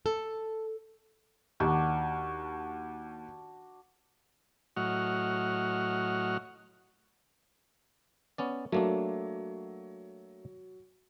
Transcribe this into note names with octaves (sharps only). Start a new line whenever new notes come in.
A4
D#2 D4 F#4
A2 F#3 F#4 D#5 F#5 F6
B3 C#4 D5
F#3 A3 A#3 D4